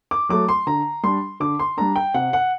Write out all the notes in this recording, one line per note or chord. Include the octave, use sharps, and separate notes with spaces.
D6
F#3 A3 D6
C6
D3 A#5
G3 D4 C6
D3 D6
C6
G3 D4 A#5
G5
C3 F#5
F#5